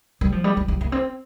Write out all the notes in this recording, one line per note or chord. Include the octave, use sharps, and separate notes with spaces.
G3
F3
G3
G3
G3
A#3
C4